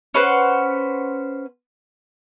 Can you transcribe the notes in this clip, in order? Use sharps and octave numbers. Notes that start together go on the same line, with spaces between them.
C#4 B4 C5 F#5